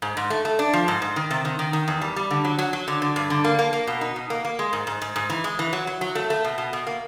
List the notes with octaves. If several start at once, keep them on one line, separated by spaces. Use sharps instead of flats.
G#2
G#2
A3
A3
D4
F3
G#2
G#2
D#3
C3
D#3
D#3
D#3
E2
G3
G3
D3
F#3
F#3
F#3
D3
D3
G2
D3
A#3
A#3
A#3
B2
D#4
B2
A#3
A#3
G#3
G#2
G#2
G#2
G#2
E3
G#3
E3
F#3
F#3
F#3
A3
A3
B2
B2
B2
A#3